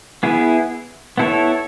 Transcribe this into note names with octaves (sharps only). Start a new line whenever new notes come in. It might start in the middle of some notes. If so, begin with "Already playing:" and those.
B3 E4 G#4
B3 E4 A4 C#5